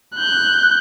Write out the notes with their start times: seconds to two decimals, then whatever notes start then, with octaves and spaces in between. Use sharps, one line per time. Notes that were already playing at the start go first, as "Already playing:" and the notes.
0.16 F#6 G6